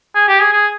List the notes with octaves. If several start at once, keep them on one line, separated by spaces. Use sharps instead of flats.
G#4
G4
G#4
G#4